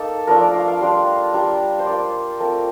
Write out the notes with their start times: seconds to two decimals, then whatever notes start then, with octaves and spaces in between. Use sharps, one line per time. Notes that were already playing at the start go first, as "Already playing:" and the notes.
Already playing: A#3 D#4 A4
0.27 F3 A3 D4 F4 A#4
0.41 D5
0.54 F5
0.68 F5
0.80 G3 D4 F4 C6
1.33 G3 D4 F4 A#5
1.79 C5
1.87 A#3 D4 F4 D5
2.40 A3 C4 F4 A#4